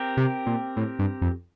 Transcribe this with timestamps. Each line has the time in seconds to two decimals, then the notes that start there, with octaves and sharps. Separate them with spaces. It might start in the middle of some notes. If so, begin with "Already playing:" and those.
Already playing: C4 G4 A#4
0.17 C3
0.46 A#2
0.77 A2
0.99 G2
1.22 F2